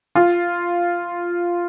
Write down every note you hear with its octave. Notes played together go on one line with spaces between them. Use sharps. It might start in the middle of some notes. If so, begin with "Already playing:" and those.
F4